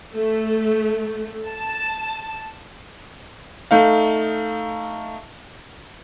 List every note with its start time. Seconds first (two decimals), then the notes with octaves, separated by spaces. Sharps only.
0.13 A3
1.46 A5
3.71 A3 D#4 F5